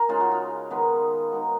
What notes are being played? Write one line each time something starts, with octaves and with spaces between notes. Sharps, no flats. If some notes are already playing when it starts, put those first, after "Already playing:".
Already playing: A#4 G#5
C#3 G#3 D#4 F4
F#4
F4
D#3 G#3 B3 D#4
D#3 G#3 B3 D#4 F#4